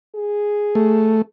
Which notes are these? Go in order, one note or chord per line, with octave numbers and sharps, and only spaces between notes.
G#4
A3